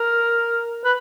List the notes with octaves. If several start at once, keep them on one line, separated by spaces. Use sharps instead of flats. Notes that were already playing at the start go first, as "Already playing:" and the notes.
Already playing: A#4
B4